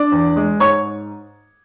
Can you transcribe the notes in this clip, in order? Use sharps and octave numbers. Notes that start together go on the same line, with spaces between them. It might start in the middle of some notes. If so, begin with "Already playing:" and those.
Already playing: D4 D5
E2
G#3
G#2 C#5 C#6